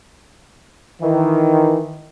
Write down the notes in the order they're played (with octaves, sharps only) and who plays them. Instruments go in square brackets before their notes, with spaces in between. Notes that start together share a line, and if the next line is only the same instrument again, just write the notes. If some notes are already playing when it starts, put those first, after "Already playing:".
[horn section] D#3 E3